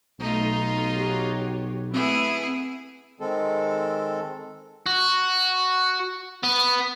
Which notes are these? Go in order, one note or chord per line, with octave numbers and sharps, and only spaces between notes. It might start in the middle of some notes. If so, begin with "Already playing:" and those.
B1 A3 D#4 F4
F#4 G4 C#5
A3 B3 C4 E4 G#4 E5
D#3 G#3 C4 A4
F#4
B3